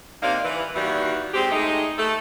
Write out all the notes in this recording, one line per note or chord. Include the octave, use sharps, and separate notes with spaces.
C3 A#3 D4 D#4 F5
E3
D#3 E3 G3 A#3 F#4
G#3 C4 G4
G#3 A3 D#4
A3 A4